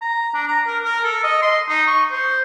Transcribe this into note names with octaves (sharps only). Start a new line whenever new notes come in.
A#5
D4
A#5
A#4
A#4
A4
D#5
C6
D#4
C#6
C5